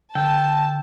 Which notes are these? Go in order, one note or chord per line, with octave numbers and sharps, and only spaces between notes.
D3 G5 A5 E6